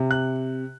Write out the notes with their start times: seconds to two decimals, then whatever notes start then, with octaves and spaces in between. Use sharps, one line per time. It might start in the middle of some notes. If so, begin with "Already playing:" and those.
Already playing: C3
0.11 F#6